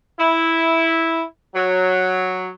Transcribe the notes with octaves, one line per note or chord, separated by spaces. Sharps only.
E4
F#3